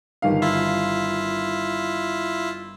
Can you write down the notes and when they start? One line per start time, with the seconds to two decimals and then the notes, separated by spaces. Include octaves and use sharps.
0.22 G1 D#3 F5
0.42 E4 F4 E5